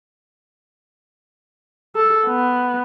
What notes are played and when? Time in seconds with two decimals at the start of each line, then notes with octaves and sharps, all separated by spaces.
1.96 A4
2.28 B3